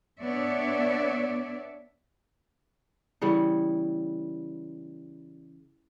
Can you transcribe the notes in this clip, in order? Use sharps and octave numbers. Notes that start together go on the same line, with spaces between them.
B3 D4 C#5 D5 E5
C#3 E3 G3 B3